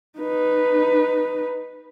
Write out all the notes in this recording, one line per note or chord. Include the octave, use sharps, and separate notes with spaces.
D#4 B4